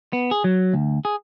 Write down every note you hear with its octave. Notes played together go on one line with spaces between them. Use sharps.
B3
G#4
F#3
D2
G#4